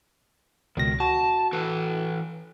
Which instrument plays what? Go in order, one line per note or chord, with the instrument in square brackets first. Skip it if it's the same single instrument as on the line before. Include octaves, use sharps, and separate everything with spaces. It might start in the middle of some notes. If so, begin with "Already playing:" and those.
[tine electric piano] C#2 B2 A#6 [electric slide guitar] D#3
[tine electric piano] F#4 [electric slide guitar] A5
[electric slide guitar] E3 A4 B4